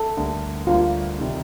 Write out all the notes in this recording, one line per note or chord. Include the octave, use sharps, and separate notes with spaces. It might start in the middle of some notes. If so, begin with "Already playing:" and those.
Already playing: A4
D2 D3 G3 A#3
D2 D3 G3 A#3 F4
C2 C3 D#3 G3